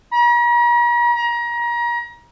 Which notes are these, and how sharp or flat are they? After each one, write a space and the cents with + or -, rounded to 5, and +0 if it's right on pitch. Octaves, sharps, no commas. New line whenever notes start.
A#5 +45
A#5 +30